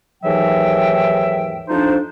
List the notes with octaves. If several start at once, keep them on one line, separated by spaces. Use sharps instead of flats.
D#2 G#2 E3 F#3 E5 G5
F2 F3 D4 D#4 C5